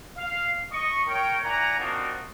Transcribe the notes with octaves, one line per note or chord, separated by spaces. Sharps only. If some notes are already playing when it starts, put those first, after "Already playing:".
F5
D#5 C#6
A#4 C#5 G5
E4 D5 F#5 G#5 A#5
C4 D4 D#4 F4 F#4 A#4